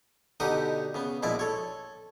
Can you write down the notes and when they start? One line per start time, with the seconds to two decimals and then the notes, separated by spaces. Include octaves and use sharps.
0.40 B2 D3 D#4 G4 F#5 D#6
0.94 C#3 B3
1.23 A#1 B2 G#3 E4 D5
1.39 A4 C#5